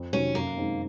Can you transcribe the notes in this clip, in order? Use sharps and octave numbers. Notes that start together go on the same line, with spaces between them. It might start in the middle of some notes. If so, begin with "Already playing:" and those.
Already playing: F2
C3 D#3 F#3 C#4
F#2 A#3
D#3 G#3 C4 D#4